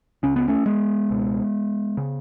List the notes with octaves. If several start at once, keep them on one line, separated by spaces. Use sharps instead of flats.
C#2 C#3 C#4
B3
A3 C#4
G#3 B3
C#2 B2
C#3